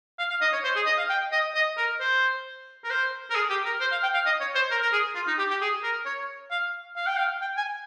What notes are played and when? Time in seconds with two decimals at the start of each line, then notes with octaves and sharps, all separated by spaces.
0.19 F5
0.30 F5
0.41 D#5
0.53 C#5
0.64 C5
0.76 G#4
0.86 D#5
0.98 F5
1.10 G5
1.32 D#5
1.55 D#5
1.77 A#4
2.00 C5
2.84 A#4
2.90 C5
3.30 A#4
3.35 G#4
3.50 G4
3.65 A#4
3.80 C5
3.92 F5
4.03 G5
4.14 F5
4.26 D#5
4.41 C#5
4.56 C5
4.71 A#4
4.83 A#4
4.93 G#4
5.15 F4
5.27 D#4
5.39 G4
5.50 G4
5.61 G#4
5.84 A#4
6.06 C#5
6.51 F5
6.96 F5
7.07 G5
7.17 F5
7.41 G5
7.57 G#5